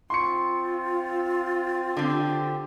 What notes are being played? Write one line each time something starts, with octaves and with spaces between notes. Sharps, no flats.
C4 F4 C6 C#6 C#7
D3 C4 G4